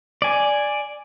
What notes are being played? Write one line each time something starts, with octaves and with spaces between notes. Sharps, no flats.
D5 G#5